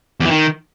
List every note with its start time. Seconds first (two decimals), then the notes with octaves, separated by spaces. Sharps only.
0.20 E2
0.25 E3
0.31 D#3